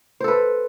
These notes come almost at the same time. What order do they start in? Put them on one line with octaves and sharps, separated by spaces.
C5 A4 B4